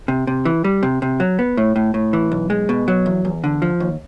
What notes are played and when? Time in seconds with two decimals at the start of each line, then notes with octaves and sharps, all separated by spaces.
0.08 C3
0.27 C3
0.45 E3
0.64 G3
0.83 C3
1.02 C3
1.20 F#3
1.39 B3
1.57 A2
1.76 A2
1.94 A2
2.13 E3
2.32 B1
2.50 G#3
2.69 B2
2.88 F#3
3.06 E2
3.25 E2
3.44 D3
3.62 F3
3.80 D#2